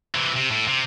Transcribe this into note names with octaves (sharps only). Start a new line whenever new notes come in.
C3 E3
C3
A2
C3